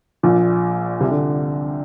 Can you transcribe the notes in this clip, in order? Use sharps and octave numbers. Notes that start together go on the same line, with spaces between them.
A#1 A#2
C2 C3
D3